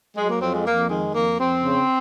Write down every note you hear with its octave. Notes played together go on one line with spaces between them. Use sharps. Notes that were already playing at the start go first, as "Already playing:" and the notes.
F#3 G#3
A#3
F2 C4
G#3
F2 A#3
D#3 G#3
F2 A#3
F2 C4
C#3